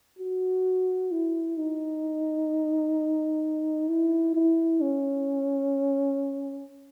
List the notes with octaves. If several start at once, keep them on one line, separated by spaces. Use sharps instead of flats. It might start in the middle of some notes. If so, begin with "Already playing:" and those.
F#4
E4
D#4
E4
E4
C#4